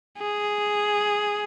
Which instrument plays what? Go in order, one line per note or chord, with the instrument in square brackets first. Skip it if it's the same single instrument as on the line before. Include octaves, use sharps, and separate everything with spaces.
[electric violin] G#4